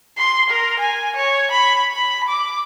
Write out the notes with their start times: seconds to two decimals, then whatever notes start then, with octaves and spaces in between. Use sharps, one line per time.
0.17 C6
0.50 A#4
0.79 G#5
1.16 C#5
1.51 B5
1.93 B5
2.29 D6